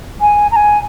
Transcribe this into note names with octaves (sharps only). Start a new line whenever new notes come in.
G#5
A#5
G#5